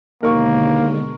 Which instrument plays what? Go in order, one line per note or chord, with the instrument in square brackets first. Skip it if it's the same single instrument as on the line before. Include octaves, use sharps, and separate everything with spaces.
[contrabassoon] D#2 [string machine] B2 D3 G#3 [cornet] A#3 [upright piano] A#4 C#6